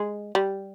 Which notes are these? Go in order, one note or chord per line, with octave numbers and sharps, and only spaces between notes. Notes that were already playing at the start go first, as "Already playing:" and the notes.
Already playing: G#3
G3